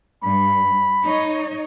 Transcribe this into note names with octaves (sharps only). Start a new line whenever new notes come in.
G2 B5
D#4 C#5 D#5